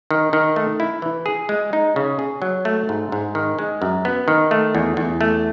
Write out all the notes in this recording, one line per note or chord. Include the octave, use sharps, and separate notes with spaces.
D#3
D#3
A3
E4
E3
G#4
G#3
D#4
C#3
G#4
F#3
A3
G#2
G#2
D#3
G#3
F#2
B3
D#3
A3
E2
E2
A3